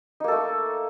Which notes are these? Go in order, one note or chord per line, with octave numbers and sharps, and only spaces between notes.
A3 A#3 D#4 A4